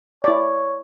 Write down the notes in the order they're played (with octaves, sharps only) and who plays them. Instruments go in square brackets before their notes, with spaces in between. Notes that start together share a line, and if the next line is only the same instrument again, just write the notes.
[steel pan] E4 D5 [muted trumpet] C#5